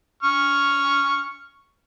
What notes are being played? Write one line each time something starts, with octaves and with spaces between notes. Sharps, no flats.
C#6 F6